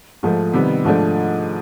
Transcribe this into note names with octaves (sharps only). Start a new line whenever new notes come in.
G#2 F3 A3
C3 D#3 G3 B3
G#2 F3 A3 D4